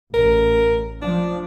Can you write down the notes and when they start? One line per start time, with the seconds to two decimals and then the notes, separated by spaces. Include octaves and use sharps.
0.14 A1 A#4
1.02 F3 D4